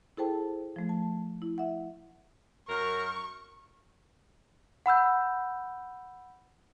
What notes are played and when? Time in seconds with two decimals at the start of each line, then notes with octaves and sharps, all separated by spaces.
0.17 E4 G#4 A4 C5 G5 A5
0.76 F3 A3
0.89 A5
1.42 E4
1.58 E5 F#5
2.69 F#2 A#4 C#6
4.86 F#5 B5 E6 G6